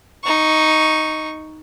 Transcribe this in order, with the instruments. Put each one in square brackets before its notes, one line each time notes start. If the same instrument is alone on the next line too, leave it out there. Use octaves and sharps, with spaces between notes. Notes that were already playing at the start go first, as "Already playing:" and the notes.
[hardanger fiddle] D#4 C#6